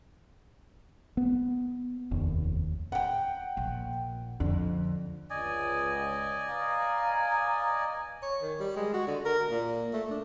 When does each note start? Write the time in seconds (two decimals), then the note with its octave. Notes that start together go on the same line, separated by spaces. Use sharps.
1.17 B3
2.11 F1 D#2
2.92 F#5 G5
3.57 A#1
4.40 F2 D3
5.30 C#2 D5 D#5 G#5
6.48 B4 F5 A#5
8.22 C#5
8.42 D#3
8.60 G3
8.76 G#3
8.93 F#4
9.07 D3
9.25 A#4
9.51 A#2
9.93 A3
10.10 D4